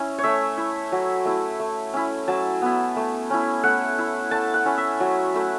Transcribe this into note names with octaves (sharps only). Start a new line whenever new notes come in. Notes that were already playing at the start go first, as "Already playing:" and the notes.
Already playing: C#4 E4
C#5
A3 E5
E4
F#3
A3 E4
A3
C#4 E4
F#3 A5
B3 E4
A3
C#4 E4
A3 F#5
E4
A3 A5
F#5
C#4 E4
E5
F#3
A3 E4